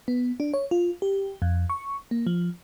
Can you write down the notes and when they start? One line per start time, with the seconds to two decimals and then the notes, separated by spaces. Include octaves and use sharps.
0.08 B3
0.40 D4
0.54 C#5
0.71 F4
1.02 G4
1.42 F2
1.70 C#6
2.11 A#3
2.27 F3